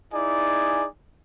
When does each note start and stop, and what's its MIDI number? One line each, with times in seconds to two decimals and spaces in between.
0.12 0.85 63
0.12 0.85 64
0.12 0.85 68
0.12 0.85 74
0.12 0.85 80